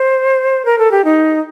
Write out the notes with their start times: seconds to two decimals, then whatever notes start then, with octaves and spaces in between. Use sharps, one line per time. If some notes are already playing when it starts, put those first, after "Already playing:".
Already playing: C5
0.65 A#4
0.78 A4
0.91 G4
1.04 D#4